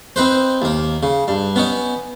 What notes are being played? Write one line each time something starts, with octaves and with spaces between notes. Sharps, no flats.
C4 D#4 B4 C5
D#2 A#3
C#3
G2
B3 C#4 D#4